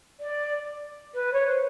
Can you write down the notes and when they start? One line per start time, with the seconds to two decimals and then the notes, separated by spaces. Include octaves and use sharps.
0.20 D5
1.13 B4
1.32 C#5
1.46 C5